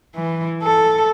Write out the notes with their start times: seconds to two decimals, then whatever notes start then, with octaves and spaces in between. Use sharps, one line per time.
0.16 E3
0.63 A4